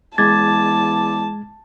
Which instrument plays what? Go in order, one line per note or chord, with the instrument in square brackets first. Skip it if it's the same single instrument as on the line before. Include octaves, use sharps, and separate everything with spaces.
[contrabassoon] E2 [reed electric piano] G#3 G#6 A6 [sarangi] A5 [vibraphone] D6